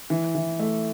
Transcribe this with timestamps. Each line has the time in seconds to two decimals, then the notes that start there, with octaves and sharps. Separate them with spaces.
0.10 E3
0.35 E3
0.60 A3